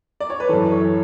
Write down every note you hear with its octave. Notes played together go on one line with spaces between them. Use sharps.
D5
C#5
B4
F#2 E3 A4
C#5